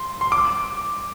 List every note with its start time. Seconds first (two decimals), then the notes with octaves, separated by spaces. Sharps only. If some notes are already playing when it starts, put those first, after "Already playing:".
Already playing: C6
0.21 C6
0.32 D6